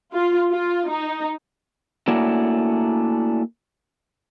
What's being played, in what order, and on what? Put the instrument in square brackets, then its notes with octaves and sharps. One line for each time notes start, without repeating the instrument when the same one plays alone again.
[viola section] F4
F4
D#4
[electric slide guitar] A3 A#3 C#4 D4 E4 F#4